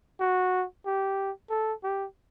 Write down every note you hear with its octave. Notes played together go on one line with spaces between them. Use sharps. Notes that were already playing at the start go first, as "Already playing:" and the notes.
F#4
G4
A4
G4